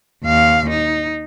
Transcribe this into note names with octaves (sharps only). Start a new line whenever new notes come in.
D#2 F5
D#4